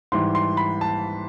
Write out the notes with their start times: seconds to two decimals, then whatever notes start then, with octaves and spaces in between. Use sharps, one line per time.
0.12 G#2 E3 G3 C6
0.35 C6
0.57 B5
0.81 A5